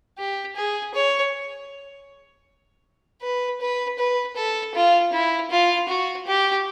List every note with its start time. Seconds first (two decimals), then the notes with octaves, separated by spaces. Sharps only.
0.18 G4
0.56 G#4
0.94 C#5
3.22 B4
3.60 B4
3.98 B4
4.36 A4
4.75 F4
5.12 E4
5.51 F4
5.88 F#4
6.27 G4